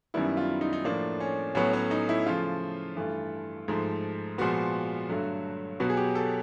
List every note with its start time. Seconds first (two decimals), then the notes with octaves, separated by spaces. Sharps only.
0.14 F#2 D#3 G3 B3 E4
0.37 F4
0.61 D#4
0.73 D#4
0.85 A2 F3 A#3 D4
1.20 C#4
1.55 A2 F#3 B3 C#4
1.73 C#4
1.91 D#4
2.09 E4
2.26 C#3 F3 A3 F4
2.96 G2 E3 A3
3.68 G#2 F3 A3
4.38 A#2 F3 G#3 B3 F#4
5.09 G2 D3 F#3 A3
5.80 B2 F#3 B3 F#4
5.90 G#4
5.97 G4
6.15 A4